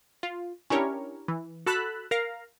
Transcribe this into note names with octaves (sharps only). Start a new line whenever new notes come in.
F4
C#4 D4 E4 G4 A#4 C#5
E3
F#4 A4 A5 B5 E6 F#6
A#4 F5 A#5